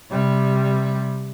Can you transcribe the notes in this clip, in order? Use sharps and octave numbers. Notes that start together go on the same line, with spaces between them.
C3 G3